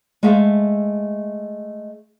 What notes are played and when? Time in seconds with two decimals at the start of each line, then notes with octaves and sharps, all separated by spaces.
0.23 G#3 A3 G#4 E5 F5